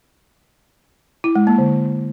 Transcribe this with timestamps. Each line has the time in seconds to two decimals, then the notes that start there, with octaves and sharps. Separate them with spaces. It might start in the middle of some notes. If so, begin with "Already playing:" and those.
1.24 E4
1.35 G#3
1.47 A#3
1.58 D3